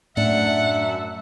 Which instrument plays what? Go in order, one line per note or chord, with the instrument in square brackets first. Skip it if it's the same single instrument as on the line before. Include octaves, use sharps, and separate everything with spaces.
[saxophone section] F#2 E5 [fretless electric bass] A2 [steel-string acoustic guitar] D4 [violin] F#5